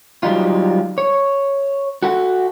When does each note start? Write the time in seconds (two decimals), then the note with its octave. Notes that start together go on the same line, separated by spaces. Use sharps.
0.23 F#3 G3 D#4 F4
0.98 C#5
2.03 F#4 A4 F#5